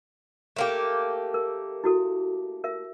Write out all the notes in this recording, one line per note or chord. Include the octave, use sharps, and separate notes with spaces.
A3 A#3 G4
A#4
E4 F#4 A4
A#4 E5